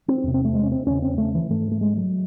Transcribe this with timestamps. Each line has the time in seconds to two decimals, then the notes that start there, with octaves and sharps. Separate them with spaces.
0.08 C4
0.23 E2 C3
0.34 C4
0.45 A3
0.55 G#3
0.63 C#4
0.72 C4
0.86 E2 C#3 C#4
1.02 C4
1.18 A3
1.35 E3
1.50 G#2 A3
1.71 A3
1.81 G#3
1.97 F#3